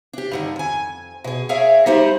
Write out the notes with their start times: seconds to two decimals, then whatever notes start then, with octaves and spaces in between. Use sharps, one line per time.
0.13 D4 G4
0.31 G2 D3 D#3
0.56 F2 G#5
1.24 B2 G#4
1.49 G#4 A#4 C#5 E5 F5
1.86 G3 A3 D#4 G4 C5